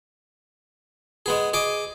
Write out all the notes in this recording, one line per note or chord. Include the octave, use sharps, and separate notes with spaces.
G#3 B3 G#4
G#4 D#5 D6